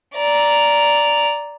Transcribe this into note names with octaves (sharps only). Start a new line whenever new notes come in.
D5 A#5